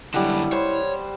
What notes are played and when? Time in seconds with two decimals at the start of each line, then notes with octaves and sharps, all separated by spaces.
0.14 F#2 D3 G3 E4 F#5
0.52 C5 C#5